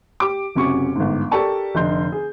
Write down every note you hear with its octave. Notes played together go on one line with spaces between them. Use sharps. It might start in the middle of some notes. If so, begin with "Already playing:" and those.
G4 D6
F#1 C3 C#4 F#4 C#6
G1 G#2
G4 A4 A#4 D5 A5 C#6
F1 D3 D#4 C6 G6
G#4